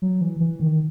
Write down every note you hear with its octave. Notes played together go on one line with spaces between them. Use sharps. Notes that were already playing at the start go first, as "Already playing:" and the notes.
F#3
E3
E3
D#3